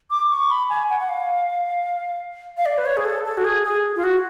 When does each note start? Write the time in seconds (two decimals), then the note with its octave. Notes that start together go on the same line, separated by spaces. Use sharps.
0.11 D6
0.31 C#6
0.50 B5
0.70 G#5
0.90 F#5
1.00 F#5
1.09 F5
2.57 F5
2.66 D5
2.78 B4
2.86 C#5
2.97 G#4
3.05 A4
3.25 A4
3.37 F#4
3.44 G#4
3.64 G#4
3.96 F4
4.04 F#4